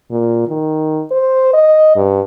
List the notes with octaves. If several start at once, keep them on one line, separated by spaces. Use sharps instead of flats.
A#2
D#3
C5
D#5
G2